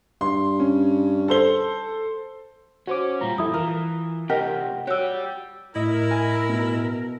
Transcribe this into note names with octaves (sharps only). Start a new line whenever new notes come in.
G2 C6
C#4
A4 C5 G7
C#4 F#4 C5 D6
A#2 G3 F4 A#5
F2 E4 A4 D#6
E3 F4 A#4
F#2 C3 G4 A#4 D#5 F#5
F#4 G4 C#5 D5 E6
A2 E4 A#4 D#5
G#5
B2